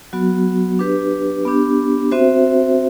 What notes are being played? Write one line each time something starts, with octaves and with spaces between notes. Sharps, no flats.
F#3 B3 F#4
D4 G4 B4
B3 D4 G4
C4 F#4 C5 E5